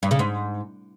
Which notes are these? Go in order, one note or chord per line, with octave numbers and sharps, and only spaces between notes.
G2
C#3
G#2